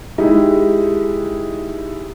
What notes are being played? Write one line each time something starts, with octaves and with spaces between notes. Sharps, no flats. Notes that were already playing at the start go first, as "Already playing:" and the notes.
G#3 D#4 E4 G4